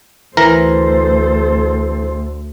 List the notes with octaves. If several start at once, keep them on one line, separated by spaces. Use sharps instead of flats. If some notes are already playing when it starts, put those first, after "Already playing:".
D2 E3 A4 A#4 C5 A#5